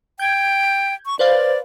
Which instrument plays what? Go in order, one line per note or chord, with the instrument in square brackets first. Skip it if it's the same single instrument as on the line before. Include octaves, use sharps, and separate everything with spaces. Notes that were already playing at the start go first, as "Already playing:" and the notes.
[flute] G5 [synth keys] G6 G#6
[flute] C#6
[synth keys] B4 C5 F5 [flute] D5